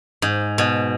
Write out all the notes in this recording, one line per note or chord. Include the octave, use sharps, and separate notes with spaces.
G#2
B2